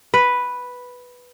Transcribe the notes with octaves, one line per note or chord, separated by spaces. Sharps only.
B4